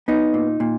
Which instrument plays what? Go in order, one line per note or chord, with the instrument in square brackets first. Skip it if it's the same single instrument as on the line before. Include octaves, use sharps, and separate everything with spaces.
[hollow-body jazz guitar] B3 D#4
A#2
A#2